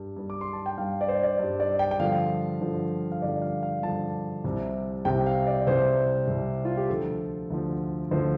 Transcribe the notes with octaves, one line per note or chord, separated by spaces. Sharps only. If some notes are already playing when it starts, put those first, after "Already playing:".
Already playing: G2 G3
G2 G3
D6
C6
A5
G5
G2 G3 F5
D5
C5
D5
G2 G3
D5
G5
G5
G2 D3 F3 F5
G2 D3 F3
F5
G2 D3 F3 D5
F5
F5
G2 D3 F3 A5
C2 C3 G3
C2 C3 G3 G5
F5
D5
C2 C3 G3 C5
C2 C3 G3
F4
G4
D2 D3 F3 A4
D2 D3 F3
D2 D3 F3 C5